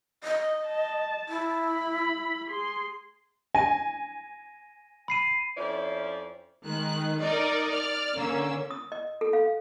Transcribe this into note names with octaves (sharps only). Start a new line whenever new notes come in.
D#5
A5
E4
B5
G#4 C6
G#5 A#6 D#7
B5 C7 D#7
F2 F3 C#4 E4 C5 D5
D#3 G#3 F#6
D#4 A#4 D5 D#5
D5 F6
D3 A#3 C#4 E6
D#6
D#5
A4
F5